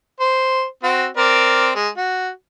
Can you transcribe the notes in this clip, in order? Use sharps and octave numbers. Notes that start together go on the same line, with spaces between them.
C5
C4 F#4
C4 A#4 D5
G#3
F#4